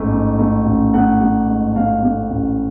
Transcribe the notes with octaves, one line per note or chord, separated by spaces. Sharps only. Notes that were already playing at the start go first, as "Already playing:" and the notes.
Already playing: A1 G#2 A3
G#2
A3
A1
A3 F#5
A3
G#2
A3 F5
A3
A1